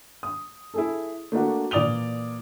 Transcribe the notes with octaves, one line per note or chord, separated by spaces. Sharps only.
D#6
E4 G#4 A4
A3 A#3 D4 F#4
A#2 E3 D5 D#6 F7 G7